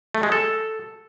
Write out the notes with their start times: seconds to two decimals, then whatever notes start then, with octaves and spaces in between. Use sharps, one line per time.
0.15 A3
0.23 G#3
0.32 A4